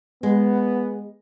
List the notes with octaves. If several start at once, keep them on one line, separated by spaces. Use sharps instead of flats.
G#3 B3